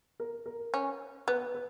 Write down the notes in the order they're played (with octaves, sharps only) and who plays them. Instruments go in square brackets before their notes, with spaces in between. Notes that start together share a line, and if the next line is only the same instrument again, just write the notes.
[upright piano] A#4
A#4
[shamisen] C#4
[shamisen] B3 [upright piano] B4
[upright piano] B4